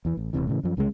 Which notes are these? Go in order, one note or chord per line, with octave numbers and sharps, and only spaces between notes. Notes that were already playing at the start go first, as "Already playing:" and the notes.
E2 E3
A1
E1 A#1 C3 E3
A2 C#3 E3
F#2 F3
C2 C#3 F#3 G#3